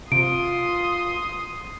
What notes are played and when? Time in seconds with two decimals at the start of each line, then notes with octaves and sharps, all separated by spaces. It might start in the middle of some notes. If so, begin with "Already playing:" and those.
0.12 C3 F4 C6 D#6 D7